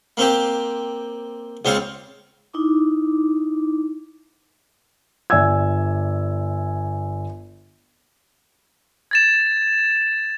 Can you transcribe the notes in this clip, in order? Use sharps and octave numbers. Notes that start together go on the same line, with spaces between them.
A#3 C4 G4
C#2 C4 C#5 F5
D#4 E4 D6
G1 D5 E5 G#5 E6 G#6
G#6 A6 E7